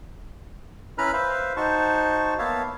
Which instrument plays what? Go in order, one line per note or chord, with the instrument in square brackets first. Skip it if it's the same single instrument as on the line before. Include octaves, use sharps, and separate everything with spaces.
[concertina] C#4 E4 B4 A#5 B5 F6
B4 C5 E5 F5
D#4 F#4 C5 A5 C#6
A#3 B3 C#5 E5 F5 A5